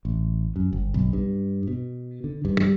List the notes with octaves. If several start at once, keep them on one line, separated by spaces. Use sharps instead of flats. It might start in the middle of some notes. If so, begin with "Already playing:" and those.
A1
F#2
G1
B1
G2
B2
D3
G2
G3